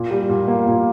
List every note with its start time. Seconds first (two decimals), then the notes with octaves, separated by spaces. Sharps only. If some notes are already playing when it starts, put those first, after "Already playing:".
Already playing: A#2
0.11 G3
0.29 A#2
0.48 A#3
0.67 A#2